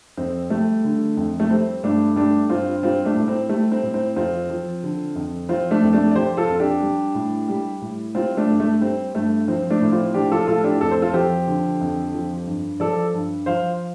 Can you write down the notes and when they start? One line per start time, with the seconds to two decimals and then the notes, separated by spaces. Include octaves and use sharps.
0.17 F2 C4
0.50 G3 A3
0.84 D3
1.17 F2
1.40 A3
1.50 G3 C4
1.84 G2 A3 D4
2.16 G3 A3 D4
2.49 G2 C4 F4
2.83 G3 C4 F4
3.05 A3 D4
3.16 A2
3.28 C4
3.49 G3 A3
3.72 C4
3.83 A2
3.94 C4
4.16 F2 C4 F4
4.50 F3
4.83 D3
5.16 F2
5.49 F3 C4 F4
5.71 A3 D4
5.83 F2
5.93 A3 D4
6.11 D5
6.15 F3 G4 C5
6.37 F4 A4
6.49 F2
6.60 D4 G4
6.82 G3
7.15 A2
7.48 G3
7.82 A2
8.15 G3 C4 F4
8.37 A3 D4
8.48 G2
8.60 A3
8.81 G3 C4
9.14 G2 A3
9.48 F3 C4
9.70 A3 D4
9.81 A2
9.92 C4 F4
10.14 F3 D4 G4
10.32 F4 A4
10.47 A2 F4 A4
10.64 D4 G4
10.81 F2 A4
10.91 C5
11.02 F4 A4
11.13 F3 G4 C5
11.47 D3
11.81 F2
12.14 F3
12.47 G2
12.80 F3 A4 D5
13.14 G2
13.46 F3 C5 F5